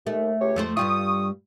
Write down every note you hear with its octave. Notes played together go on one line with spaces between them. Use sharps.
D#2 A3
C#2 G4 C#5
F2 A3 C5
G2 G3 F4 C#6 D#6